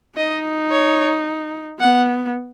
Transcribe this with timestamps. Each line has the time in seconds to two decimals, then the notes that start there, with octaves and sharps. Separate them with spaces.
0.17 D#4 D#5
0.71 C#5
1.80 B3 F#5